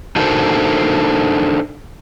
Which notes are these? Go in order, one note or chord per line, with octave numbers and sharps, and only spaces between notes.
D4 D#4 F#4 A4 A#4 C5